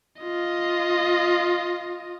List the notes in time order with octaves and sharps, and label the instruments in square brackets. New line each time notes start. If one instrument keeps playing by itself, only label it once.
[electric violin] F4 D#5